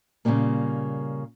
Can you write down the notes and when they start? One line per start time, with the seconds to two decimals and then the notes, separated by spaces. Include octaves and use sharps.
0.25 A#2 C#3 E3 F#3 G3 A#3